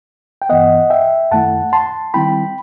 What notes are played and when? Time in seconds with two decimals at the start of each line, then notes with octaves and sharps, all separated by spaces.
0.42 G5
0.49 G2 E3 B3 D#5 F#5
0.90 E5 G5
1.31 F#2 D#3 A3 E4 F#5 A5
1.73 A5 C6
2.14 D#3 G3 C4 E4 G5 B5